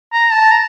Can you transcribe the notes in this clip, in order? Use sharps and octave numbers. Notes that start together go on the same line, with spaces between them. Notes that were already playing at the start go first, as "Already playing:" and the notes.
A#5
A5
A#5